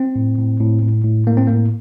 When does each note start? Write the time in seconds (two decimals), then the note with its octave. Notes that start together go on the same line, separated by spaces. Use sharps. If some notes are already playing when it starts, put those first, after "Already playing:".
Already playing: C4
0.16 A2
0.38 A2
0.60 A2
0.82 A2
1.04 A2
1.27 A2 A#3
1.37 C4
1.47 A2 A#3